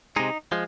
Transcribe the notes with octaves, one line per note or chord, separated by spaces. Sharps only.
C3 G#3 D#4
F3 G#3